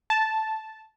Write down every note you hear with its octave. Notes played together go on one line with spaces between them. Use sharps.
A5